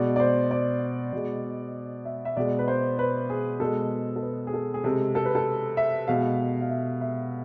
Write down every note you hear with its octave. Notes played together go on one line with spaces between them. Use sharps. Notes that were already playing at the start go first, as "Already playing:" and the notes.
Already playing: B2 G#3 D5
D5
C5
D5
B2 G#3
E5
E5
B2 G#3 D5
B4
C5
B4
G#4
B2 G#3 A4
A4
B4
G#4
A4
G#4
C3 G#3 A4
A4
B4
A4
E5
B2 G#3 F5
F5
E5
E5